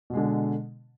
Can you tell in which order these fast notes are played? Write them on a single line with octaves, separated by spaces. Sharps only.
B2 G#3 D3